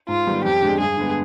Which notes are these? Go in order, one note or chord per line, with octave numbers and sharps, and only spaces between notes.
G#2 F4
D#3 G3 B3
F2 G4
D3 G#3 D4
G2 G#4
D3 G#3 B3